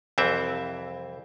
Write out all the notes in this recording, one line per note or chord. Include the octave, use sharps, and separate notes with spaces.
C2 F2 E3 C4 E5